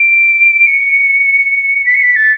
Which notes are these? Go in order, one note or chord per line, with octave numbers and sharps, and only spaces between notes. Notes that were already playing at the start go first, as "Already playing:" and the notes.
Already playing: D7
C#7
B6
C#7
B6
A6